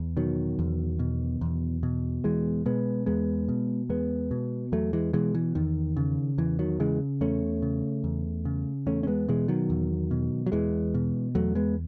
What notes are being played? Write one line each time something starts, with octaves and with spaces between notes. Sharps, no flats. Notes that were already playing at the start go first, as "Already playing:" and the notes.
Already playing: E2
B2 D#3 F#3
E2
B2
E2
B2
E2 E3 G#3
B2 G#3 B3
E2 G#3 B3
B2
E2 G#3 B3
B2
E2 F#3 A3
E3 G#3
B2 E3 G#3
E3
E2 D#3
C#3
E2 E3
D#3 F#3
C#3 E3 G#3
E2 A3 C#4
C#3
E2
C#3
E2 A3 C#4
C#4
G#3 B3
B2 E3 G#3
D#3 F#3
E2
B2
F#3
E2 E3 G#3
B2
E2 F#3 A3
G#3 B3